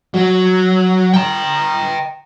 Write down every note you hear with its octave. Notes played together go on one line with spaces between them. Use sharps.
F#3
G5 A#5